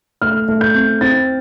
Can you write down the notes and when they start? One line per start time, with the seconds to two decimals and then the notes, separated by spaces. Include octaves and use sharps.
0.22 A3 F6
0.48 A3
0.61 G6
0.75 C4
1.01 C4 A6